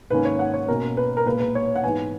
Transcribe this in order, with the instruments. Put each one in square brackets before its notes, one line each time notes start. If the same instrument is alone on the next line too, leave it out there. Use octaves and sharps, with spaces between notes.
[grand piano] G#2 D#3 A#3 C#4 B4
C#5
F#5
C#5
B2 A#3 C#4 A#4
B4
A#4
A#2 G#3 B3 B4
B4
C#5
F#5
G#2 E3 B3 G#5